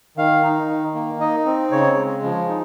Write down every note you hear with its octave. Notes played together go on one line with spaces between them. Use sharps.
D#3 F5
D#4
D#3
A#3
D#4 D#5
C4
C#3 C#5
G#3
F3
D#4